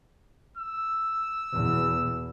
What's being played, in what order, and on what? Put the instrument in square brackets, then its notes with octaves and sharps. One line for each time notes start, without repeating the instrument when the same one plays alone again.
[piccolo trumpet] E6
[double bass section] E2 B2